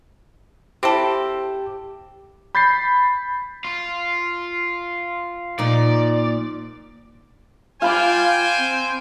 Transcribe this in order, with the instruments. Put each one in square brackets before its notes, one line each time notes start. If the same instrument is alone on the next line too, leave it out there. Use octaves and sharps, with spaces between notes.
[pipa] C4 E4 A4 [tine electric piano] G4
[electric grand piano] B5 G6 A6 B6 C7
[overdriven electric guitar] F4
[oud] A#2 F3 D#4 [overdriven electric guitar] D5
[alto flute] F4 [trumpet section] C5 G5 G#5 [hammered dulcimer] F5 B5 D6
[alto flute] C4